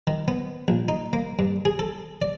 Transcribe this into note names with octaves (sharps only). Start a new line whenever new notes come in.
D#3
B3
A#1
D#4
A#3
G2
G#4
A4
D5